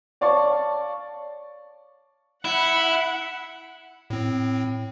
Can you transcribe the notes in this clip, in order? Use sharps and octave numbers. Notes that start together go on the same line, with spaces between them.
C#5 D5 F5 A5 C#6
E4 F#5 B5
A2 C4